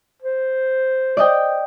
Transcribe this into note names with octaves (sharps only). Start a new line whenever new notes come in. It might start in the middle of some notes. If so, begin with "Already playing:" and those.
C5
D5 D#5 G5